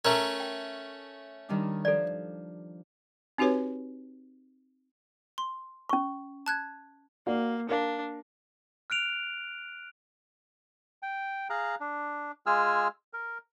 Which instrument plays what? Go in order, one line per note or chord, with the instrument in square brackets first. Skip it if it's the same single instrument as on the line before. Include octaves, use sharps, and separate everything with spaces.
[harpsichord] A3 C#4 [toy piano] A#4 A#5 C6
[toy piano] G5
[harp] D#3 G3 D4
[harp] F3 [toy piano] A4 D5
[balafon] C4 D#4 F#4 G4 B4 C#5
[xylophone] C6
[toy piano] C#4 C#6
[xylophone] A5 F#6 G#6
[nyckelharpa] A#3 [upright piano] F#4 D5 F5
[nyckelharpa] D4 [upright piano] A#4 F5
[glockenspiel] F6 F#6 D7 F7
[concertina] G5
G#4 F5 A#5 F#6
D4
G#3 F4 G#4 G#5 E6 F6
A#4